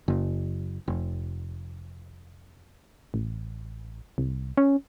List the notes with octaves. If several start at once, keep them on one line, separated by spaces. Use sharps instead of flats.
F#1
F1
A1
C2
C#4